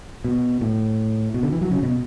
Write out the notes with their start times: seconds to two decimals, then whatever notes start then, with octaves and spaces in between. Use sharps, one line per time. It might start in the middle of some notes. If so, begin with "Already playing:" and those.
0.24 B2
0.61 A2
1.34 B2
1.43 D3
1.53 E3
1.61 F#3
1.71 C#3
1.83 B2